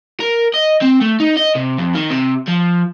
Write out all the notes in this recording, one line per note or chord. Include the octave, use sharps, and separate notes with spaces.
A#4
D#5
C4
A3
D#4
D#5
C3
F2
D#3
C3
F3